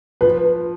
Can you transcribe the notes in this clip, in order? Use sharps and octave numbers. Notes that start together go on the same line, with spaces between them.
F3 B4